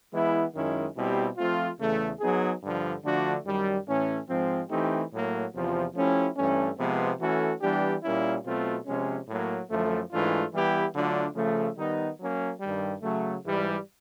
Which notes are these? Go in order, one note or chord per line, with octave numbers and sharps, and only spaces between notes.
E3 G#3 B3 E4
F#2 D#3 G#3 C#4 E4
B2 G3 C4 E4 G4
F3 A3 C4 F4
E2 C#3 E3 A3
F#3 B3 D#4 G#4
G2 D3 F3
D3 F3 A3 D4 F#4
F#2 D#3 G3
A2 E3 A3 C#4
G#2 F3 G#3 C4
E3 A3 C4 D#4 G4
A2 F#3 A#3
E2 C3 F3
F3 A3 C#4 E4 G4
G2 E3 A3 C#4
C3 F3 G#3 B3
E3 A3 C#4 F#4 A4
E3 G3 B3 D4 G4
A#2 G3 A#3 C#4 E4
B2 F#3 A3 C4 F4
C3 F3 G#3 C#4
A2 F#3 A#3
F#2 D3 F3 A3
G#2 E3 A3 D4 F4
E3 G3 B3 E4 G4
D3 F#3 A3 D4 F4
C#3 F3 A3
D#3 G3 B3 D#4
F#3 A#3 C#4
G2 D#3 G3
C#3 F#3 A3
G#2 E3 G3